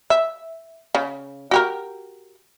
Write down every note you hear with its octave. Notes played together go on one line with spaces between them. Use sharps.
E5
C#3
F#4 G4 A#4